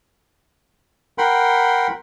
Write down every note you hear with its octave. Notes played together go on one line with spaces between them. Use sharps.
A#4 F#5 G5 B5 C6